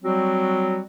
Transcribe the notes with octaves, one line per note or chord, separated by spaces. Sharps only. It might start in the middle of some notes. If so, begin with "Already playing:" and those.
F#3 G3 C4 F#4